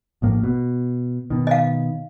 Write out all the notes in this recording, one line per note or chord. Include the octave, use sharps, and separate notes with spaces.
A#1 A2 A#3
B2
B2 D#3
D#5 F5